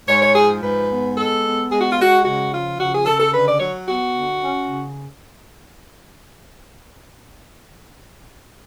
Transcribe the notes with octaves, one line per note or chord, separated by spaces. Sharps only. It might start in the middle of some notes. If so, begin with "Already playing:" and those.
G#2 C#5
C#5
F3 G#4
G#2 B4
B3
G#3 A4
B3
G#3 G#4
F#4
F4
G#3 F#4
C#3 F#4
F3 F4
C#3 F#4
G#4
C#3 A4
A4
D3 B4
D5
F#3 C#5
B3 F#4
D3
C#4
C#3